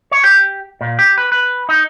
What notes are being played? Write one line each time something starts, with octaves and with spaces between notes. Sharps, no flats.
C#5
G4
A#2
G4
B4
B4
D#4